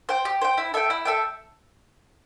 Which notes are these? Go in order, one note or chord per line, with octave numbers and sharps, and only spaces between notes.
C5 G5
G4
C5 G5
E4
A4 E5 G5
E4
A4 E5 G5